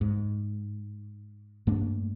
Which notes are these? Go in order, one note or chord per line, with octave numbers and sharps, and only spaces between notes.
G#2
G2 A3 A#3 D4